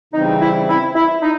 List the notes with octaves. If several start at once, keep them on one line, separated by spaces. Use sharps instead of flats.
C#3 E3 G3 C4 D#4
E4
E4
E4
D#4